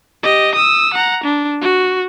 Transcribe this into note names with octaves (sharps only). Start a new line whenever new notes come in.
G4 D#5
D#6 E6
F#5 A#5
D4
F#4